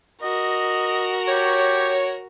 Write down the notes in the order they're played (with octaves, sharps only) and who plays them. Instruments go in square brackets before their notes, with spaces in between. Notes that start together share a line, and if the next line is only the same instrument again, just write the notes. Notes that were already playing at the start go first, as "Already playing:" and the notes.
[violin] F#4 A#4 [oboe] D#5
[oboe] G4 [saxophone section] C#5